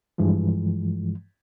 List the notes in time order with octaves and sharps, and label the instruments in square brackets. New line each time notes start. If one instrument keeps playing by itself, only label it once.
[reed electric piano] G2 E3 F3 G#3